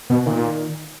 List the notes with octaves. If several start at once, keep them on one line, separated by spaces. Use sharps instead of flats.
B2
A#2 D#3